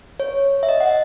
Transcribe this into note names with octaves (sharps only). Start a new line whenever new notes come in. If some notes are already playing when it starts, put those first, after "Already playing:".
C#5
E5
D#5
F#5